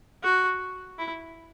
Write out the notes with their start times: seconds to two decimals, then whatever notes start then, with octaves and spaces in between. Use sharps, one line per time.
0.23 F#4
0.98 E4